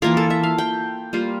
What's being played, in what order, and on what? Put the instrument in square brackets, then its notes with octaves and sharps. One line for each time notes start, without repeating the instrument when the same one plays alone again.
[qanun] E3 A#3 F4 A#4
A4
E5
F5
G5
G3 A#3 F4